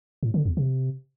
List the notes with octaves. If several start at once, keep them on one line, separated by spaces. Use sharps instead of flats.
A2
D3
E2
C3